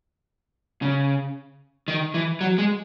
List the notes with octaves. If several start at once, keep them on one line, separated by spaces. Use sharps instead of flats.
C#3
D#3
E3
F#3
G#3